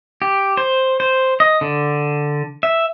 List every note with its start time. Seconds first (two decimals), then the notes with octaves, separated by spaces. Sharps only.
0.22 G4
0.57 C5
1.00 C5
1.40 D#5
1.61 D3
2.63 E5